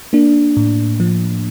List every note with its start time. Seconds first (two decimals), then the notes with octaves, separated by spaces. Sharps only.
0.13 A#3 D4
0.57 A2
1.00 F3